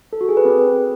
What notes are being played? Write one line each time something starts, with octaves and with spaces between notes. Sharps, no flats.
A4
F#4
G#4
B4
C4